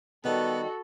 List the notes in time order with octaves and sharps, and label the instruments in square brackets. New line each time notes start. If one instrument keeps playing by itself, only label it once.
[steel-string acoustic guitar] D#3 G3 [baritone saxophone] B3 [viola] F#4 A4